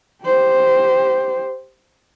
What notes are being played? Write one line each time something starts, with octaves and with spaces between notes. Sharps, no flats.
G4 C5